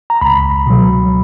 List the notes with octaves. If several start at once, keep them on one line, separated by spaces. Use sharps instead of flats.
A#5
C#2 B5
B2 F#3